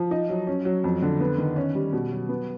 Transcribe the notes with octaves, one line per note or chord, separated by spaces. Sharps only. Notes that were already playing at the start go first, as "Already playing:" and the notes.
Already playing: F3
D#4
F#3
C#4
F#3
F2
D3
B3
D#3
C#4
G3
B2
F#3
B3